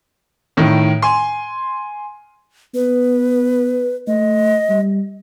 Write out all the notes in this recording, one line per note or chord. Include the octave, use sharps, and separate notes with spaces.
A2 D#3
G#5 C6
B3 B4
A3 D#5
G3